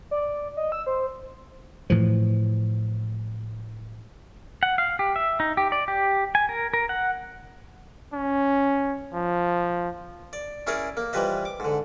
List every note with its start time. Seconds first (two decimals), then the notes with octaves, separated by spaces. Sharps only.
0.11 D5
0.57 D#5
0.72 E6
0.86 C5
1.90 A2 E3 F3
4.63 F#5
4.78 F5
4.99 G4
5.16 E5
5.40 D#4
5.57 G4
5.72 D5
5.88 G4
6.35 G#5
6.49 A#4
6.74 A#4
6.89 F#5
8.14 C#4
9.14 F3
10.33 D5
10.67 C#4 E4 G#4 A#4 D5
10.97 A#3
11.13 E3 F3 G3 B4 D#5
11.45 D6
11.60 G#2 D3